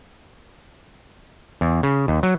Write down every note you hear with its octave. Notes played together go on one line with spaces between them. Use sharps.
E2
C#3
D#2
F#3